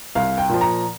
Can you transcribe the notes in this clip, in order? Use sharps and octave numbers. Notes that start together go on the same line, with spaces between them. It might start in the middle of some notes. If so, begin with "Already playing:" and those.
C2 F5
G5
A#2 F3
A#5